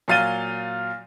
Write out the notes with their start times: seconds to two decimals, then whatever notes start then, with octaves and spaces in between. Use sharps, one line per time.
0.08 A#2 F#3 F5 A6 D#7 G7